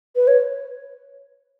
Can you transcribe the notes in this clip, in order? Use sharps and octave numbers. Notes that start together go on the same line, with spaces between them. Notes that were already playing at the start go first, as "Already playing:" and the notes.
B4
C#5